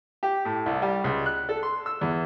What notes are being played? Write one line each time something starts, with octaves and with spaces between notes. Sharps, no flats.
G4
A2
C2
G3
C#2
F#6
A4
C6
E6
E2